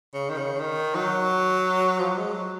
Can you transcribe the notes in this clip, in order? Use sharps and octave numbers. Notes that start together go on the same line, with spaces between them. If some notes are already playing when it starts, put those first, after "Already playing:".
C#3
D#3
C#3
D#3
F#3
F3
F#3
G#3
F#3